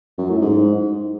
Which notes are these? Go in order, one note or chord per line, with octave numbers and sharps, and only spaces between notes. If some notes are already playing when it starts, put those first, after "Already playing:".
F#2
A2
G#2